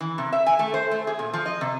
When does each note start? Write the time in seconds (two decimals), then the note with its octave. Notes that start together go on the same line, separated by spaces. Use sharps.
0.01 E3
0.18 C3
0.33 E5
0.46 G#5
0.59 A3
0.74 C5
0.91 A3
1.07 G#4
1.19 A#2
1.33 F3
1.46 D#5
1.61 C3